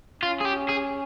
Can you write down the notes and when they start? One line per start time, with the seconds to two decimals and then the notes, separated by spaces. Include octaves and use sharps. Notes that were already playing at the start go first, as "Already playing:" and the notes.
0.22 C#4 F4
0.40 G#4
0.45 G4
0.69 G#4